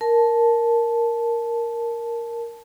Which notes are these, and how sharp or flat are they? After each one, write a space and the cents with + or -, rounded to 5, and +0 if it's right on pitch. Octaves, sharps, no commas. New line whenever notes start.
A#4 +0 A5 -10